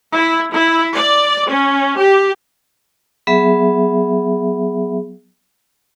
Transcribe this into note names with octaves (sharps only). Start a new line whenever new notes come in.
E4
E4
D5
C#4
G4
F#3 B3 G#4 E5